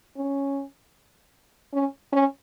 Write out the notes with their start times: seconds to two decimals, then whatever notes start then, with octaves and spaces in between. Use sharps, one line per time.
0.16 C#4
1.73 C#4
2.12 C#4